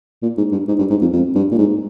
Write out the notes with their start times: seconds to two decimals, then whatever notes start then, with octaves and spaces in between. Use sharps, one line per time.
0.22 A#2
0.37 G#2
0.52 G2
0.68 G#2
0.79 G2
0.90 G#2
1.01 F2
1.13 F2
1.35 G2
1.51 A#2
1.58 G#2